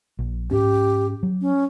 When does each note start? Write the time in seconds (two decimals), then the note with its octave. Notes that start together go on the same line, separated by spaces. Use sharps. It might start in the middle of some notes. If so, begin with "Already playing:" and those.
0.19 A#1
0.51 G#2 C#4 G4
1.23 F#3
1.41 C#4